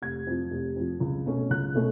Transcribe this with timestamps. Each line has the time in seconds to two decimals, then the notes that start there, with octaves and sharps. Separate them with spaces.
0.02 F1 G#6
0.27 F2 F3
0.51 F1
0.76 F2 F3
1.00 C#2
1.26 B2 A3 C#4
1.50 C#2 F#6
1.75 B2 A3 C#4